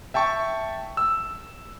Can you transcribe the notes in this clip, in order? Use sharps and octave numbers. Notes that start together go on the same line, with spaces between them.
E5 G5 A5 C#6
E6